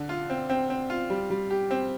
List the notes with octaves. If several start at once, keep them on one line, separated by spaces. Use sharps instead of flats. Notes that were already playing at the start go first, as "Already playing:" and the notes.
Already playing: D3
F4
C4
C4
C4
F4
G3
G3
G4
C4